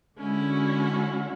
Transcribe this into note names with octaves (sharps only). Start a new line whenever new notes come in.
D3 G#3 C#4 E4 F#4